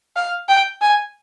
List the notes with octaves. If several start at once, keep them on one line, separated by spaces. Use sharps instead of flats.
F5
G5
G#5